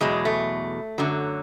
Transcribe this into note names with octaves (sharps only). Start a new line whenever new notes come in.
E2 B2 F#3 G#3
A3
F#2 D3 F#3